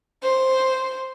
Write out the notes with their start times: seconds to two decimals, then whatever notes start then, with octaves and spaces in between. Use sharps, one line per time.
0.23 C5